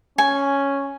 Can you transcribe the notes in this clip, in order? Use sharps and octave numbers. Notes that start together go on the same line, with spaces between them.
C#4 G#5